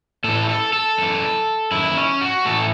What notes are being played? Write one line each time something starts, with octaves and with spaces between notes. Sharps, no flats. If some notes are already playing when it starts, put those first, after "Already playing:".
A2 E3 A4
A4
A4
F#2 E3
F#2 D#3 E4
C#4
F#4
A2 E3 A4